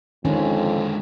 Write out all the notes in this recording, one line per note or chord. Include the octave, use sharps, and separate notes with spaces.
F2 D3 D#3 G#3 C#4